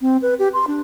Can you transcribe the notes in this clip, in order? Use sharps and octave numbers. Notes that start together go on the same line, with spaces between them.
C4
B4
G4
C6
D4